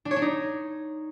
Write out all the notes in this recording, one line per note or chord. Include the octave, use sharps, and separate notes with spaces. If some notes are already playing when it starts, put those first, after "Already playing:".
D4
C#5
D4
D#4